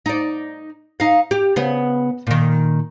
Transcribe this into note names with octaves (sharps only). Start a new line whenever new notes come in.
D#4 D5
D#4 F5
G4
C#3 B3
A#2 D#3